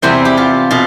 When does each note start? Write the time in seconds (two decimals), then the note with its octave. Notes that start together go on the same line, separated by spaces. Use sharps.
0.02 E2 C3 G3 C4 E4 C5
0.25 G4
0.37 F4
0.71 B2 F4